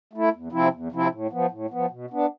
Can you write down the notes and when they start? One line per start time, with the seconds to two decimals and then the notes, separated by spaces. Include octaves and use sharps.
0.13 A3 E4
0.33 E2
0.52 C3 F3 C4 E4
0.73 E2
0.92 C3 F3 C4 E4
1.11 A2
1.31 F3 B3
1.51 A2
1.70 F3 B3
1.90 B2
2.10 B3 D4